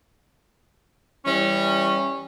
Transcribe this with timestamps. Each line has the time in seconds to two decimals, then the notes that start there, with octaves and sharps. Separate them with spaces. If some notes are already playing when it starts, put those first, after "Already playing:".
1.25 E3 G3 C#4